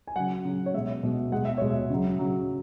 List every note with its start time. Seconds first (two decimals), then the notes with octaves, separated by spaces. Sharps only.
0.07 G#5
0.16 C#3 F#3 F#5
0.45 C#3 F#3
0.66 C#5
0.74 B2 G#3 E5
1.03 B2 G#3
1.32 B2 G#3 F#5
1.45 E5
1.58 B2 G#3 C#5
1.70 E5
1.90 C#3 F#3
2.19 C#3 F#3